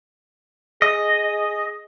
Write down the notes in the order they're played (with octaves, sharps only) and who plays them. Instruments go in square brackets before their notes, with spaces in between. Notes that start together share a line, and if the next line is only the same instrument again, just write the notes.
[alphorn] G#4 [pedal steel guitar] D#5